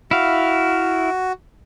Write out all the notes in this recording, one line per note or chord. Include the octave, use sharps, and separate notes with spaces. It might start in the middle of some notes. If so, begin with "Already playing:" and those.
E4 F#4 F5